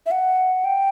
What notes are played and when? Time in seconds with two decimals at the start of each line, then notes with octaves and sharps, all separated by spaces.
0.06 E5
0.11 F#5
0.65 G5